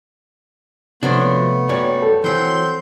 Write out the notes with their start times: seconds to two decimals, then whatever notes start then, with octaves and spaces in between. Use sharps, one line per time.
1.03 C3 F3 F#3 A3 B3 D4
1.69 F#2 G3 C#5 D5
2.02 A4
2.24 E3 F#3 C4 C6 G6